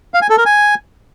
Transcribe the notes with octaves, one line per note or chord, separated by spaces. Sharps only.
F5
G#5
A4
A#4
G#5